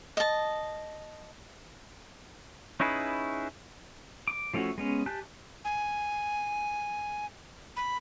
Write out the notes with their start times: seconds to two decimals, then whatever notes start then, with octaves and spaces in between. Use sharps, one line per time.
0.17 D#5 A5
2.80 C#4 D#4 E4 G#4 B4
4.28 D6
4.54 F3 A3 C#4 E4 F#4
4.78 G#3 B3 C#4
5.06 G4 G#5 A5 F#6 G6
5.65 G#5
7.76 B5